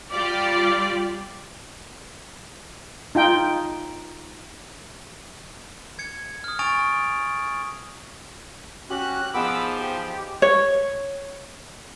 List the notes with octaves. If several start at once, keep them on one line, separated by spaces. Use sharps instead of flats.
G3 F4 G4 D5
D#4 F4 G5
G#6 C#7
D#6 F6
G#5 C#6 D#6 A6 D7 F7
C#4 F#4 G4 F#6
F3 B3 D#4 G#4 B5 D6 E6
G4 C5
C#5